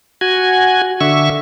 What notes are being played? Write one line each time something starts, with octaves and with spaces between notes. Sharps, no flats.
F#4 G#5
D3 E5 C#6